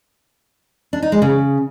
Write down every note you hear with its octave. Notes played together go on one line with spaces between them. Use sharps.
D4
D#4
G#3
C#3